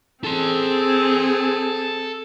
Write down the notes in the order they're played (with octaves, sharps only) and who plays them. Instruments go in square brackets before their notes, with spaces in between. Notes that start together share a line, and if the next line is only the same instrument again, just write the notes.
[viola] C4 G#4 [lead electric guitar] A4 C6